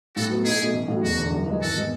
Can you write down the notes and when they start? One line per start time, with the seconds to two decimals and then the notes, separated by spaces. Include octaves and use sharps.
0.15 A2 F#4 A4
0.30 F#3 B3 E4
0.45 B1 E4 G#4
0.60 B2 A3
0.73 A1
0.88 A2
0.93 F#3
1.03 E1 F#4
1.18 E2 D3
1.32 F#2
1.46 E3 G#3
1.61 G#1 F#4 A4
1.77 G#3 B3